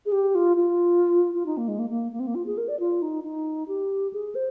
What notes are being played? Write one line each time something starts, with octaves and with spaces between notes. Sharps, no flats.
G#4
G4
F4
F4
F4
D#4
A#3
G#3
A#3
A#3
A#3
C4
A#3
F4
G#4
A#4
D5
F4
D#4
D#4
G4
G#4
C5